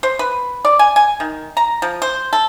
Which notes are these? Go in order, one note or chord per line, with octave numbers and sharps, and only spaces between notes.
C5
B4
D5
G#5
G#5
D#3
A#5
F3
C5
A4